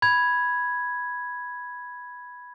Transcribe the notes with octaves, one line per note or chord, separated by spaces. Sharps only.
B5 G#6